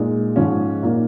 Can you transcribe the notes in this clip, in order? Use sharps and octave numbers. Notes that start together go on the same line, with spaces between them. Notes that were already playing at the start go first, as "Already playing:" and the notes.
Already playing: A#2 G#3 D#4
G#2 F3 G#3 C#4 F4
A#2 A#3 D#4